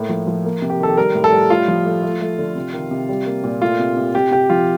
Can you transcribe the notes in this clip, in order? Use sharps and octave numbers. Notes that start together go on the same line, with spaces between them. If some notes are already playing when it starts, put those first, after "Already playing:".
Already playing: A2 A#3
F3
F3
A#3
C3
G4
D#3 A4
G3 A#4
A2
A4
G3
A2 F4
F3
A3
A3
A3
D3
C3
D#3
C3
G3
A#3
A#2
A3 F4
C3
C3
C3 G4
C3 G4
F3 F4